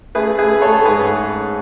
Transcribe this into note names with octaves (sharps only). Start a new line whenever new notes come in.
A3 G#4 B4
A3 G#4 B4
A3 A4 C#5
A4
G#2 G#4 B4